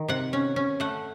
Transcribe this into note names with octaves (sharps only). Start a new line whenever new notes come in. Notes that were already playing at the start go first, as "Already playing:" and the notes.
Already playing: D#3
C3 F#5
C#4
C#4
A3 F#5